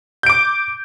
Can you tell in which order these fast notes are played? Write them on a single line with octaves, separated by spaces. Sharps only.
G6 D7 D6